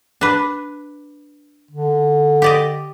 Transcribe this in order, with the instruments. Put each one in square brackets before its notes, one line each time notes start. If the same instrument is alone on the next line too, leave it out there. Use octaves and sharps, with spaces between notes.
[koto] D4 B4
[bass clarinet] D3
[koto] G4 D5 D#5